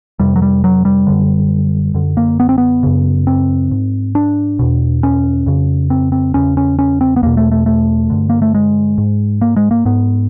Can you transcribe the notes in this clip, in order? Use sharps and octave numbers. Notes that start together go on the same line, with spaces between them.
F2 C3 G3
F#3
G3
F#3
G3
F#2 D3
F#2 D3
A#3
B3
C4
B3
F#2 C#3
C4
G#2
D4
E2 B2
C#4
F2 C#3
C4
C4
E2 C#3 C#4
C#4
C#4
C4
B3
E2 B2 A#3
A3
A3
A3
G2 D3
A#3
A3
G#3
G#2
A#3
G#3
A#3
G#2 B3